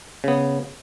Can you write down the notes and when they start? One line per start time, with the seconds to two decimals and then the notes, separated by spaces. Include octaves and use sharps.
0.24 C#3 B3